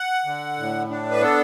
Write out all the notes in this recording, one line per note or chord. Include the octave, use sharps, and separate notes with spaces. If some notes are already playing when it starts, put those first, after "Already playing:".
Already playing: F#5
D3
A2
D4
B4
B3 A4